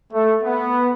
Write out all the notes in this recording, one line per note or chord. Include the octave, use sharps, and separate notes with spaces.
A3
B3